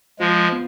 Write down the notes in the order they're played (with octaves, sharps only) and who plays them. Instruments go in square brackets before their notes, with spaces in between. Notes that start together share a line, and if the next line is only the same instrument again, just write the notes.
[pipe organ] F3 G#3 [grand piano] F4
[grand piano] B3